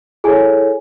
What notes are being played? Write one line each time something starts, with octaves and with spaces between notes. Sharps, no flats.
E4 G#4 A4 C#5 G#5